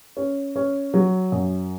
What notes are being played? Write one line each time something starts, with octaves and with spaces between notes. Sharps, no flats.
C#4
C#4
F#3
F#2